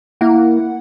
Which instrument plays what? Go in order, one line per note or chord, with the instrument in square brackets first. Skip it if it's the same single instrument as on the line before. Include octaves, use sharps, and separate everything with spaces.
[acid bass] A#3 [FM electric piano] E4 F#5